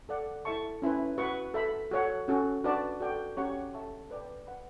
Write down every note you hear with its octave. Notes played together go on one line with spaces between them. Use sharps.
A4 D5 F#5
E4 A4 E5 A5 C#6
C#4 E4 B4
F#4 B4 F#5 C#6
A4 E5 B5
F#4 A4 C#5 F#5
C#4 F#4 A4
D4 F#4 B4 D5 A5
F#4 A4 D5 G5
C#4 G4 C#5 F#5 C#6
A4 E5 A5 C#6
B4 D5 G5
B4 F#5 B5